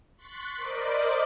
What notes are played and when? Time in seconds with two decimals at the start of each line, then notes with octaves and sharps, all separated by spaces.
0.16 C6 C#6 F#6 A6 B6
0.56 A#4 C5 D5 D#5 B5 D6